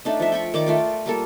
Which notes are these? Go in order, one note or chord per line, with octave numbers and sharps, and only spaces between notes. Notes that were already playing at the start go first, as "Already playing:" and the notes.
A3 D4 D#4
F3 E5
G5 B5 C#6
D#3 D5 D6
A3 F4 G5
G3 A#3 A4